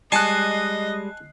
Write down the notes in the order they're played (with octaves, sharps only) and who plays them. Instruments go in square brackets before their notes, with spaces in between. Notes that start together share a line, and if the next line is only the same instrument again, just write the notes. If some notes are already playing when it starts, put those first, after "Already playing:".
[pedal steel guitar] G3 G#3 [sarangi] D#5 [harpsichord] G#5 A5 C#6 [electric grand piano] F#6 C7